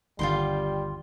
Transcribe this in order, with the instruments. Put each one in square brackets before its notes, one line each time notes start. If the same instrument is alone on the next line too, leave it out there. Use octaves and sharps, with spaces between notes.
[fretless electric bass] G1 D#2 D3 [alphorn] G3 [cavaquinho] F4 G5 C6